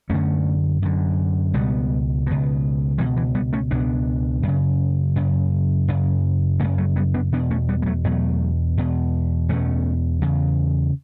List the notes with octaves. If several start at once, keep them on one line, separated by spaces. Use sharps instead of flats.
F#2 D3 A3 C#4
F#2 D3
C#2 B2 G3 B3
C#2 B2
C#2 B2 E3 G3
E3
G3 B3
A3 C#4
C#2 B2 B3 D4
F#2 C#3
F#2 C#3
F#2 C#3
F#2 C#3 A3 C#4
F#3 A3
G3 B3
B3 D4
E2 B2 B3 D4
A3 C#4
G3 B3
G3
F#3 A3
E2 B2 F#3 A3
E2 B2
E2 B2 A3 C#4
E2 C#3